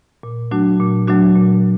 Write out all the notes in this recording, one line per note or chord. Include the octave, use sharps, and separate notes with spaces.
A#2
F#3 A3 D4 F#4
A#2
F#3 A3 D4 F#4
A#2